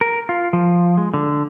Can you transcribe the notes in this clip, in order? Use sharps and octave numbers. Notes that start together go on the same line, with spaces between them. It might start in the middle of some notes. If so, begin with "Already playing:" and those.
A#4
F4
F3
G#3
D3